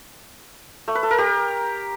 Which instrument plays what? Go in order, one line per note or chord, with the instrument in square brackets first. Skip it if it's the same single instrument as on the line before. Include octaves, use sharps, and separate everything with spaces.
[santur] A3
B4
A4
A#4
G4